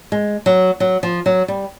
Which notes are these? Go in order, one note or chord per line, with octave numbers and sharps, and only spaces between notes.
G#3
F#3
F#3
F3
F#3
G3